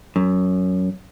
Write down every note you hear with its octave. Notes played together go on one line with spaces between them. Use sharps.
F#2